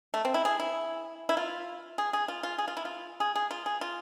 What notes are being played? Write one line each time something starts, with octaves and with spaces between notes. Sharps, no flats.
A3
C4
E4
G#4
E4
E4
F4
G#4
G#4
F4
F4
G#4
F4
E4
F4
G#4
G#4
F4
G#4
F4